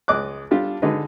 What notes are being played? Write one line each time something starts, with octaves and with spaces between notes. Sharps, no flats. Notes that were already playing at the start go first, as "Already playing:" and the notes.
C#2 D#5 D6 F#6
G3 D4 F4 G4 A4
D3 G#3 D#4 F#4 B4